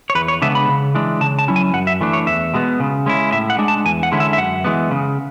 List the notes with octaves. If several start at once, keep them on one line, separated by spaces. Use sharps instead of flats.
C#5
E2 B4
C#5
C#3 G#3 B3 D4 E5
B5
C#3
E3 G#3 D4
C#3 A5
A5
F#3 C#4 E4
G#5
F#2 F#5
E5
E3 A3 D4
C#5
E2 E5
B2 G#3 B3
C#3
G#3 C#4 E4
A2 E5
F#5
G#3 D4
A5
E2 G#5
F#5
D3 G#3 C#4 E4
E5
E5
F#2 F#5
E3 G#3 B3
C#3